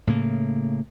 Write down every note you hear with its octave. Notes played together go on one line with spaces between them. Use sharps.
A2 C#3 A#3